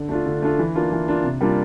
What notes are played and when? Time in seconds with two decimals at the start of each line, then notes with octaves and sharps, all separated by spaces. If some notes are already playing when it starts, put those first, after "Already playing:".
Already playing: D3
0.09 A3 D4 F4
0.26 D3
0.42 A3 D4 F4
0.59 E3
0.75 A#3 D4 F4
0.92 E3
1.08 A#3 D4 F4
1.24 C3
1.41 G3 A#3 D4 F4